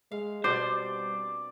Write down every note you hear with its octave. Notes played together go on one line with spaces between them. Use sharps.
G#3 F5
B2 G3 C4 D4 C5 D5